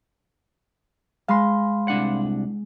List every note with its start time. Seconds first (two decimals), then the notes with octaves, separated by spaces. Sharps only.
1.28 G#3 F5 B5 C6
1.88 C2 D4 F#5